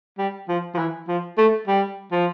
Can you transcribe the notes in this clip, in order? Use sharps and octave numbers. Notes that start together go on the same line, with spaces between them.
G3
F3
F3
E3
F3
A3
G3
F3